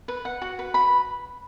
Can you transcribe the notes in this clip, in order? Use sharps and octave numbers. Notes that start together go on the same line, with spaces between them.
B4
F#5
F#4
B4
B5